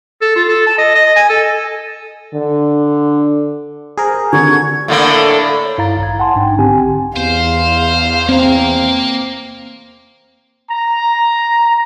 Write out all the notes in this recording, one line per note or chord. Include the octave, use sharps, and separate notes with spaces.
A4
F4
A4
A5
D#5
D#5
G#5
A4
D3
G#4 A#4 C5
D3 C#6 G#6
A2 D3 A#3
C#5
G2 E4 F5 A#5 A6
A1 G#6
F#5 G#5 A5 C6
G#2 D4 D#4 G5
B1 D3 C4 G4 G#5
E2 C5 F5
A#3 C4 A#5
A#5